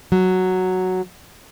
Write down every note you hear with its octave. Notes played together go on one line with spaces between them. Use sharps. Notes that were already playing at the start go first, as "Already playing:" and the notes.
F#3